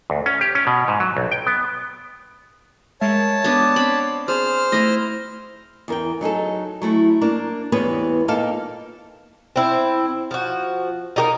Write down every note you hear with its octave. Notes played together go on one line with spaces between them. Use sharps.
D2
C#4
G4
C#4
B2
G#2
F#3
B1
G5
B3
G#3 A#4 C#5 E5 A5
B3 D4
C4 B5
G#4 C5 F6
A3 E4 D#5
E2 A#4 G5
F#3 D#4 G#4 A4
F#3 A3 E4 A4
A#3 D4 A#4
E2 G3 B3 C4 B4 C#5
A#2 A#3 D#4 A4 F5 A5
C4 E4
F3 F#4
D#4 G4 A#4